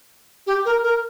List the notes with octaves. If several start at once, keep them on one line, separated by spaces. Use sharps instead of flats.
G4
A#4
A#4